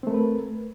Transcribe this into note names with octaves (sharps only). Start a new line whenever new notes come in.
A3 C4 A#4 B4